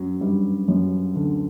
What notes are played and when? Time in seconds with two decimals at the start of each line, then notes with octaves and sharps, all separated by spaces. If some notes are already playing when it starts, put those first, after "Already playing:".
Already playing: F#2 F#3
0.21 G2 G3
0.68 F#2 F#3
1.16 D2 D3